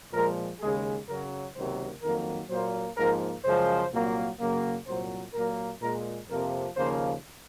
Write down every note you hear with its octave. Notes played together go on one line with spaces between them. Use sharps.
A#2 F3 G#3 A#4
D#2 C#3 G#3 G#4
F#2 C#3 F#3 A#4
C#2 C3 D#3 F#3 A#3 C5
F2 D#3 F#3 A#3 A#4
A#2 F#3 A#3 C5
G#2 F3 A#3 A#4
F#2 C#3 F3 G#3 C5
C2 A#2 F#3 A#3
F#2 C#3 F#3 A#3
C2 A#2 F#3 C5
A#2 F#3 A#3 A#4
A#2 G#3 A#4
F2 C3 F3 A#3 A#4
D#2 C#3 F3 A#3 C5